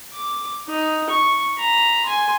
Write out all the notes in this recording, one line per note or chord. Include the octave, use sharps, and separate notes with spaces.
D6
D#4
C#6
A#5 B5
G#5 C6